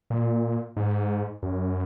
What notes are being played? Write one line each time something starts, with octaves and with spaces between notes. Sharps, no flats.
A#2
G#2
F#2